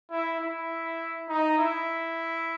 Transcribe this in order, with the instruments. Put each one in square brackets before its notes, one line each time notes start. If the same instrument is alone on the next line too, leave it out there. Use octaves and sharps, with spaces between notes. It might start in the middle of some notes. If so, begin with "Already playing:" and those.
[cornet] E4
E4
D#4
E4